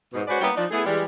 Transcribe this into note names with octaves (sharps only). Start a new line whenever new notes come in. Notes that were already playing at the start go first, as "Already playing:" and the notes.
G#2 B2
G#3 C#4 F#4 B4 C5 D5
G3 A#3 B3 C#4 E4 G4
F3 D4 D#4
A3 B3 E4 G#4
E3 G3 G#3